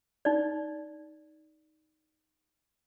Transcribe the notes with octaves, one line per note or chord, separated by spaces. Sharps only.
D#4 D5